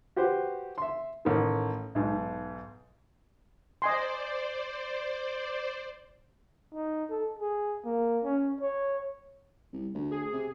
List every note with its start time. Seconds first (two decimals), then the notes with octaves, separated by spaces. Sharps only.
0.16 F#4 G4 B4 C5
0.78 E5 C6
1.25 A1 D#3
1.95 B1 G#2
3.82 C5 D5 D#5 G#5 C6
6.75 D#4
7.10 A4
7.39 G#4
7.85 A#3
8.24 C#4
8.61 C#5
9.73 C2
9.95 D2
10.11 G#4
10.33 C3